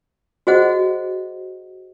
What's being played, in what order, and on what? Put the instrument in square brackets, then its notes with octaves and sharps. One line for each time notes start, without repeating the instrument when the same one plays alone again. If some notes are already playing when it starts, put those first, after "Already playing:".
[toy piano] F#4 G#4 C5 D#5 F#5